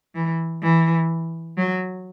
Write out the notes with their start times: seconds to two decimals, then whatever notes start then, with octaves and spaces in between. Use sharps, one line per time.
0.15 E3
0.62 E3
1.57 F#3